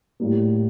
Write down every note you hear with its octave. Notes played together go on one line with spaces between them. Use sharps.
A2 G3 A#3